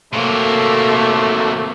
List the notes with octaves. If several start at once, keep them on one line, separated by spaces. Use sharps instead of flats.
C3 F#3 A3 A#3